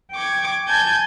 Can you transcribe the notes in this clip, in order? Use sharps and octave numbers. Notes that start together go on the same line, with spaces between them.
G5 C#6 D6 G#6
G#5 A5 G6 G#6